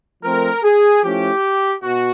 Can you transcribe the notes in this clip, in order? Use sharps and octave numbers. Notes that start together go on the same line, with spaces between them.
F3 A3 C4 A#4
G#4
F3 A3 C#4 E4 G4
B2 F#4